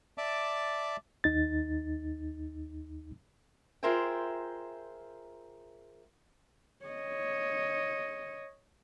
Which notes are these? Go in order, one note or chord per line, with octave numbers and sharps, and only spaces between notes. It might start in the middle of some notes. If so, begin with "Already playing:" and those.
D5 E5 A5 D6
D#2 D#4 A6
F4 G#4 A#4 C5 E5 G5
C#5 D#5